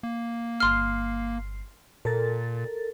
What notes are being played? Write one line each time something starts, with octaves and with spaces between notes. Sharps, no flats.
A#3
G1 C6 F6 C7
A#2 A4 A#4 A6